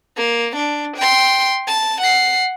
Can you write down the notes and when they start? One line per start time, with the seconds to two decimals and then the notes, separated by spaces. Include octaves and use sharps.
0.17 A#3
0.56 D4
0.97 G5 C6
1.68 A5
2.01 F#5 C7